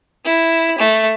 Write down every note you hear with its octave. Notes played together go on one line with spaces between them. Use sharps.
E4
A3